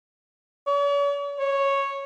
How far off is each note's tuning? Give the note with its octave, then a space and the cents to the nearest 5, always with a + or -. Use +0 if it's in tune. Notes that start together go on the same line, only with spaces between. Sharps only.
C#5 +45
C#5 -5